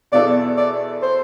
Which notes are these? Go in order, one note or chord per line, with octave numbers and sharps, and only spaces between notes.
E2 B2 B3 E4 A4 D5
D5
C5